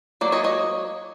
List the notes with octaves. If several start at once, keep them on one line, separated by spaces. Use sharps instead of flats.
F#3 A#3 D5
C#5 D#5
C#5 D#5